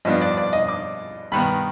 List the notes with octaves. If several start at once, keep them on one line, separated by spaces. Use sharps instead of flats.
G2 F3 B3 D4 D#5
D5
D5
D#5
D6
G2 D#3 B3 B5